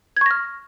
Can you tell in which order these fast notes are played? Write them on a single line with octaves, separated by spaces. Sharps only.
G#6 C#6 A#6 F6